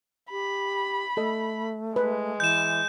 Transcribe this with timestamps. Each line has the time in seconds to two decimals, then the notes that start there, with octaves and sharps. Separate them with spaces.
0.31 G4 B5
1.17 A3 A4 D#5
1.96 G#3 B4
2.40 E3 G6 E7